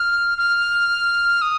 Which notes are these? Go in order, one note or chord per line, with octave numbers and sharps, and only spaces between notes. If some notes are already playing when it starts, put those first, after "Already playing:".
Already playing: F6
F6
D#6